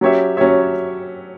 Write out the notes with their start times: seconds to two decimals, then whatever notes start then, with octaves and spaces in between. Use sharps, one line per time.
0.01 F#3 C#4 G4 C#5 E5
0.37 F#3 C#4 G4 C#5 E5